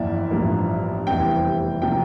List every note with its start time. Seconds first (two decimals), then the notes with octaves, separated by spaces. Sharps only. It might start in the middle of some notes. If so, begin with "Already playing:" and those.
Already playing: G1 F2 E3 A#3 E4 D5 E5
0.31 A1 G2 F3 A#3
1.06 F1 E2 E3 G3 C4 G5
1.82 C3 F3 A#3 G5